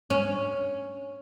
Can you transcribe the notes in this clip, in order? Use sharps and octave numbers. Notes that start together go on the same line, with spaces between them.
C#4